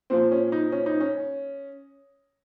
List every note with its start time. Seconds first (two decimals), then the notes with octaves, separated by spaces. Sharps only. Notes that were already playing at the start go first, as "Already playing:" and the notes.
0.10 A#2 F3 C4
0.31 C#4
0.52 D#4
0.72 C#4
0.86 D#4
1.01 C#4